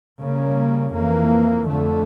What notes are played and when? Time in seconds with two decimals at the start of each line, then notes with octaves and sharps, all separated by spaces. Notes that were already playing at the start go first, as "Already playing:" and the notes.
0.21 C#3 G3 A#3 C#4
0.95 F2 E3 A#3
1.69 F2 D3 A3